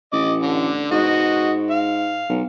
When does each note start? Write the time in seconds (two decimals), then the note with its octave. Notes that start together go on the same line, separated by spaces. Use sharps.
0.13 A1 D#5 D6
0.42 D3
0.91 G#2 F#4 D#5
1.70 F5
2.29 B1